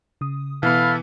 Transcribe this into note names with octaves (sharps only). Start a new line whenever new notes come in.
C#3 D#6
B2 E3 B3 A4 E5 F5 B5